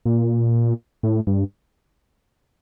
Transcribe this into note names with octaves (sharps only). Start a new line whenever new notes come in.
A#2
A2
G2